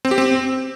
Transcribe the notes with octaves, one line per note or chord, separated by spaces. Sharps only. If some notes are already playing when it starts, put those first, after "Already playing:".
C4
G4
C4